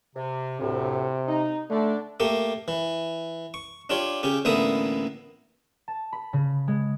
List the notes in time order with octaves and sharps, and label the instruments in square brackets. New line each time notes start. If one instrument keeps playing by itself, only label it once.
[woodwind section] C3
[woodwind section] D2 A2 [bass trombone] C3
[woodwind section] D#4
[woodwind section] D3 D4 [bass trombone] A3
[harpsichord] A3 A#3 G4
E3
C#6
D4 F4 G4 C#5
C#3 C#4 G4
A1 D3 A#3 B3 E5 D#6
[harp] A5
B5
C#3
G#3